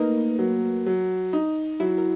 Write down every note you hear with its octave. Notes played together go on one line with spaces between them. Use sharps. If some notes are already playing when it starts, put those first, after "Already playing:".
Already playing: A3 A#3 D#4 A#4 B4
F#3
F#3
D#4
F#3 E4 E5
A#4